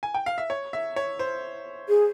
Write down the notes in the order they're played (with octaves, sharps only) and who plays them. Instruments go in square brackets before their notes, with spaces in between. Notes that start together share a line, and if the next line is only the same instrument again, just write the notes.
[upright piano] G#5
G5
F5
E5
C#5
E5
C#5
C5
[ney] G#4